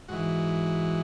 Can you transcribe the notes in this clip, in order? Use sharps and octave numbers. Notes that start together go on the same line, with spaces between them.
G#2 E3 F#4